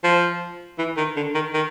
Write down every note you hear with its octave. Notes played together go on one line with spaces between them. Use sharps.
F3
E3
D#3
D3
D#3
D#3